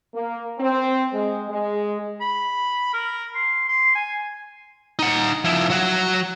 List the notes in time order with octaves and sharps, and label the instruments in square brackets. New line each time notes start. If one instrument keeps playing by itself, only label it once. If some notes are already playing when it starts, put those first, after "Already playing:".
[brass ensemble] A#3
C4
G#3
G#3
[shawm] B5
A#4
C6
C6
G#5
[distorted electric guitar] D#4 F#5
F3 E4
F#3 F#4